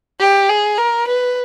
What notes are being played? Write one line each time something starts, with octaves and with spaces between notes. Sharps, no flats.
G4
G#4
A#4
B4